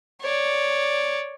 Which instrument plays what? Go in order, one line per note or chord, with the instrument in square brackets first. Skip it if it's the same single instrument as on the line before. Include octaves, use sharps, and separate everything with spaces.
[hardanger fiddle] C#5 D5